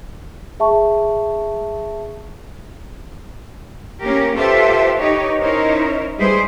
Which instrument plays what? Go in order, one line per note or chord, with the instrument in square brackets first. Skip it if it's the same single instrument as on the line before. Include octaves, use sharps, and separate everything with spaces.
[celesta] G#4 E5 A5 C#6
[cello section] A#3 C#4 G4 A#4
F4 G4 A4 B4 C5 E5
D#4 G4 B4 C#5 D#5
C#4 D#4 E4 A#4 C5 C#5
G3 G#3 E4 G#4 B4 C5